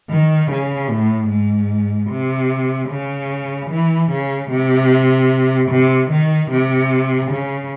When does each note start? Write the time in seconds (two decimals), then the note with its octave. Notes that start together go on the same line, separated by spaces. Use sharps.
0.10 D#3
0.51 C#3
0.90 A2
1.30 G#2
2.10 C3
2.90 C#3
3.70 E3
4.11 C#3
4.51 C3
5.70 C3
6.11 D#3
6.50 C3
7.31 C#3